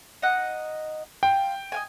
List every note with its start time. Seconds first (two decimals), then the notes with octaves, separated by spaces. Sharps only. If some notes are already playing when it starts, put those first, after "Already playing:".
0.22 D#4 D#5 F#5
1.23 F4 G5
1.72 D#5 F5 G#5